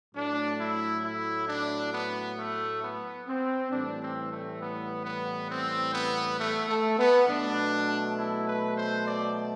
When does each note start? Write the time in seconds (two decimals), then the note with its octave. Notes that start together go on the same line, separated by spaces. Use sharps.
0.14 A2 F#3 A3 D4
0.59 E4
1.04 E4
1.48 D4
1.92 B3
2.37 A3
2.82 B3
3.27 C4
3.71 A2 E3 G3 D4
4.01 C4
4.31 A3
4.60 B3
5.05 B3
5.50 C4
5.94 B3
6.38 A3
6.68 A3
6.98 B3
7.27 B2 F#3 A3 D4
8.17 E4
8.46 B4
8.76 C5
9.06 D5